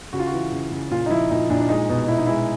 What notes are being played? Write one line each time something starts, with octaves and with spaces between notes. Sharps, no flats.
C#3 F#4
F4
F#4
E3
C#3
C#3
A#2 F4
D#4
F3 E4
A#2 D#4
A#2 D4
D4
G#3 D#4
B2
B2 E4
D#4
G#3 E4